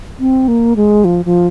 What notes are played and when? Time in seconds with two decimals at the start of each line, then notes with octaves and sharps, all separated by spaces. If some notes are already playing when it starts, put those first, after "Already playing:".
0.20 C4
0.48 A#3
0.76 G#3
1.05 F3
1.25 F3